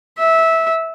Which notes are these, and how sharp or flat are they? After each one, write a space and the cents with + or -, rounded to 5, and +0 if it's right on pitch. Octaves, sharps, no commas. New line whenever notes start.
E5 -15